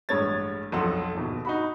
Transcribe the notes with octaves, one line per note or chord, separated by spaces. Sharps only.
A1 G2 G#3 C#5 G#6 A6
B1 F2 A4 F#5 C6
A#1 D#2 B2
D#4 F#4 B5